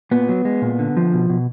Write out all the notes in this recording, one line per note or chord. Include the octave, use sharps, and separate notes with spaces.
A#2 B3
F#3
G#3
A#2
D3
F3
B2
B2